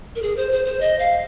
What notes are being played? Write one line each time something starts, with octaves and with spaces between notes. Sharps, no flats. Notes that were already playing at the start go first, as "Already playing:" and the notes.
A#4
G#4
C5
C5
C5
D#5
F5